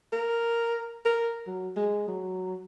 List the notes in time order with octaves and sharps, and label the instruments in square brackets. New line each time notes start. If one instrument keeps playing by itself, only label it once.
[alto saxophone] A#4
A#4
F#3
G#3
F#3